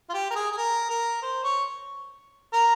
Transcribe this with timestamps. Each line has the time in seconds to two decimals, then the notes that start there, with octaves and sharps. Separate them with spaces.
0.10 F4
0.14 G4
0.31 A#4
0.35 G#4
0.52 G#4
0.57 A#4
0.90 A#4
1.22 C5
1.44 C#5
2.53 A#4